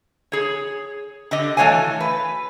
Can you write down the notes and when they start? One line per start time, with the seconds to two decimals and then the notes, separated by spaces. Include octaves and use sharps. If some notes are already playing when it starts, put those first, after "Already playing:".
0.32 G#4 C#5
1.31 D3 G4 D#5
1.57 E3 A3 F#4 C#5 F5 G#5
2.00 B4